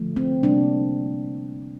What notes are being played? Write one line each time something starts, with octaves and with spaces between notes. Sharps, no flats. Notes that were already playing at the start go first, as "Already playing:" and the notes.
Already playing: D3 F3 A3
C4
C3 G3 A#3 D4